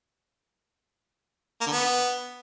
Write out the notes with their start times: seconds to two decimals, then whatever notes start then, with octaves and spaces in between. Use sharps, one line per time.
1.61 A#3
1.66 D3
1.72 B3